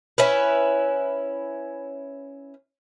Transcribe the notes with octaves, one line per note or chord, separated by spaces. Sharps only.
C#4 E4 B4